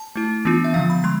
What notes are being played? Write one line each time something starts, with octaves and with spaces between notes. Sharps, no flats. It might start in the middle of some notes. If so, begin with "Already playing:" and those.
Already playing: A5
A3 E4
E3 B3 D4 F4
E5
D3 F3 B3 F5
B5
G#3 C6